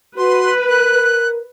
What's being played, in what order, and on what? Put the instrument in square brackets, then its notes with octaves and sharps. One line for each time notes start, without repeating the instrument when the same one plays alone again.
[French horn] F#4 [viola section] B4 [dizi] C6
[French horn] A#4 [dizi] F#6